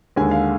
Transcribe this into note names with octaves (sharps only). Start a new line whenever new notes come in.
D#2 D3 G#3 G#5
F5